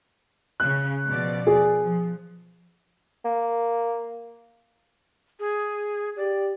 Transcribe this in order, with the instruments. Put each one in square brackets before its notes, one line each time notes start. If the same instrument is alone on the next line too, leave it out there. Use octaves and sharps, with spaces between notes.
[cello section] C#3 [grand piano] F#6
[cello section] B2 F3 D5
[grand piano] G#4
[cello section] F3
[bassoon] A#3
[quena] G#4
[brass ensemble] G4 [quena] D5